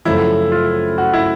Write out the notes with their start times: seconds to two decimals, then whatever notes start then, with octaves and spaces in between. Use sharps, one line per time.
0.05 F#2 C#3 F3 A3 C4 E4
0.52 F4
0.98 F#4
1.13 E4